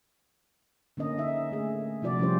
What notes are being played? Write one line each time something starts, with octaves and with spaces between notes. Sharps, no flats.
D3 A#3 C#4 D#5
D#4 E5
A3 G#4
C3 F3 E4 F#4 D5
F3 G3 C#4 E4 G4 C5